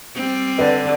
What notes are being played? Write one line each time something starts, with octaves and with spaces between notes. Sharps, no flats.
G3 C4
D3 B4 D5